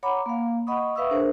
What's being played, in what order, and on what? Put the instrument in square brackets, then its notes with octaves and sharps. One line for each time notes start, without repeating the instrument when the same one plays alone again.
[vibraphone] C#5 F#5 A#5 B5 D6
A#3 F5
D#5 F#5 B5 C#6 D#6
B4 E5 F5 C#6 D#6 E6
D4 G#4 A#4 C5